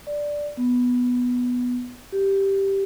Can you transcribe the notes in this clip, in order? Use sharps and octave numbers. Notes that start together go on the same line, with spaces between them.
D5
B3
G4